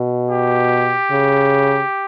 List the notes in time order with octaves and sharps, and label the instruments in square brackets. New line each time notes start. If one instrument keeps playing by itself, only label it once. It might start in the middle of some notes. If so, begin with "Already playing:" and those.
Already playing: [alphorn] B2
[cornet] G4
[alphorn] C#3